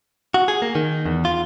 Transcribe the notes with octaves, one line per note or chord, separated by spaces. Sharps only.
F#4
G#4
A#3
D#3
E2
F4